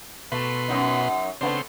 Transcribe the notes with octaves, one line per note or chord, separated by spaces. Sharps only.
B2 A3 B4 C6
F#2 F#3 D#4
C#3 A3 B3 C4 D4 C6